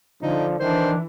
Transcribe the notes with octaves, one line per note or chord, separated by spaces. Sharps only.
D3 F3 D#4
D#3 E3 D4 C5